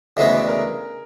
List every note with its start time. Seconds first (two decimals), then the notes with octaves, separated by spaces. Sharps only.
0.16 D2 C#3 E3 G#3 B3 C#5 D#5
0.32 D5 E5
0.48 G#4 A#4